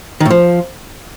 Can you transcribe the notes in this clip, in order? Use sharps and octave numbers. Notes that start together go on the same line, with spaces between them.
D#3
A2
F3